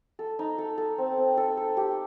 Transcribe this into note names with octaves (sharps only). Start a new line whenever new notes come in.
A4
D#4
A4
A4
C4
C4
A4
A4
G4